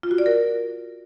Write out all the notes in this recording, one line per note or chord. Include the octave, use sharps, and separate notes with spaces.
F4
F#4
D5
A#4